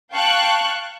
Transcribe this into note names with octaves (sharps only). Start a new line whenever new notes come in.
F5 G5 A5 C#6 F#6